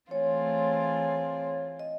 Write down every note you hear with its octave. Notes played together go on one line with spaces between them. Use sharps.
E3 A3 C4 F4 G#4 C#5
D#5